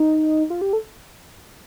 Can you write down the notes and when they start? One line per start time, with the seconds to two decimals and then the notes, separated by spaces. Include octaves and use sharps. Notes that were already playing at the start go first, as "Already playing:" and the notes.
Already playing: D#4
0.50 F4
0.61 G4
0.73 A4